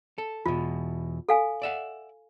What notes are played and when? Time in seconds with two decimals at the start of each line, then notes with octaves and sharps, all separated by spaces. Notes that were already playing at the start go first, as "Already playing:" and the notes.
0.18 A4
0.46 E2 B2 F4
1.29 A4 F5 G#5
1.62 D5 E5 F#5